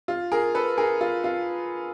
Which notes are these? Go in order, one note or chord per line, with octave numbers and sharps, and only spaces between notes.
F4
G#4 A#4
A4 B4
G#4 A#4
F4
F4